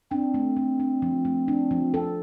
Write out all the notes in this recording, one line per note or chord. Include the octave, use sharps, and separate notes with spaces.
C4 D4
A3
A3
D4
F3
A3
D4
F3
A4